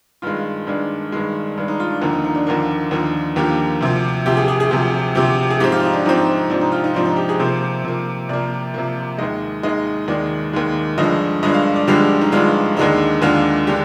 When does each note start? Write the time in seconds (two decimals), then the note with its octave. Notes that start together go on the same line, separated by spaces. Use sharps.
0.22 G2 D#3 G#3 F4
0.67 G2 D#3 G#3 D4
1.12 G2 D#3 G#3
1.57 G2 D#3 G#3 D4
1.68 D#4
1.80 F4
1.90 D4
2.01 D#2 D3 F3 A#3 D#4
2.13 D#4
2.24 D#4
2.35 D4
2.47 D#2 D3 F3 A#3
2.91 D#2 D3 F3 A#3 D#4
3.36 D#2 D3 F3 A#3 G4
3.81 D2 C3 F3
4.26 D2 C3 F3 G4
4.37 G#4
4.48 G#4
4.60 G#4
4.71 D2 C3 F3 G#4
5.15 D2 C3 F3 G4
5.50 G#4
5.60 G#2 F3 C4 G4
5.72 F4
5.83 D#4
5.93 D4
6.05 G#2 F3 C4 D#4
6.50 G#2 F3 C4 D4
6.61 D#4
6.72 F4
6.84 D#4
6.94 G#2 F3 C4 D4
7.05 D#4
7.17 G4
7.29 G#4
7.39 C3 F3 A#3 C5
7.85 C3 F3 A#3
8.29 C3 F3 A#3 D5
8.74 C3 F3 A#3
9.18 D#2 D#3 G#3 D#5
9.63 D#2 D#3 G#3 D#5
10.08 D#2 D#3 G#3 D5
10.53 D#2 D#3 G#3
10.98 G2 D3 F3 G#3 D4 D#5
11.43 G2 D3 F3 G#3 D4 D#5
11.54 F5
11.76 D5
11.88 G2 D3 F3 G#3 D4 G4
12.22 D#4
12.32 G2 D3 F3 G#3 D4 F4
12.77 D#2 D3 G#3 D4 D#4
13.22 D#2 D3 G#3 D4 F4
13.67 D3 G#3 D4 G4